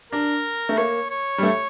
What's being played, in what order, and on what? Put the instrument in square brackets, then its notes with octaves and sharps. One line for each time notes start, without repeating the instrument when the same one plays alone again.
[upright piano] D4 [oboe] A#4
[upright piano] A3
[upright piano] A#3 [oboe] C#5
[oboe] C#5
[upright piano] G3
A3